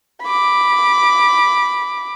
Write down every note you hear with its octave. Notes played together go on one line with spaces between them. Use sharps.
B5 D6